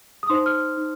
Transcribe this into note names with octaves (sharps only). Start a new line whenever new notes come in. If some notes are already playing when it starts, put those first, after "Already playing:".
D#6
D#4 C5 C6
F6
D#4